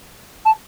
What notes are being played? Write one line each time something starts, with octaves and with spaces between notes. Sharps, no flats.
A5